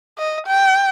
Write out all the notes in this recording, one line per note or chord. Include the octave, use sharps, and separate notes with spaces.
D#5
G5